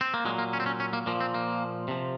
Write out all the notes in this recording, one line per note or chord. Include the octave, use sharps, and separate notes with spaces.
C4
A#3
A#2 F#3 G#3
A#3
C#4
C4
C#4
C#4
A#3
A#2 F3 A#3
C4
A#3
C3 F3